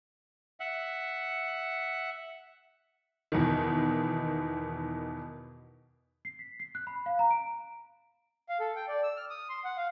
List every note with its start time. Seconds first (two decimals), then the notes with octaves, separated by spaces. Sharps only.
0.60 E5 F#5
3.32 E2 B2 D#3
6.25 C7
6.39 B6
6.60 C7
6.75 F#6
6.87 B5
7.06 F5
7.19 A#5
7.31 D7
8.49 F5
8.60 A4
8.76 G5
8.88 D5
9.03 E6
9.17 F6
9.30 D#6
9.49 C6
9.64 F#5
9.77 F5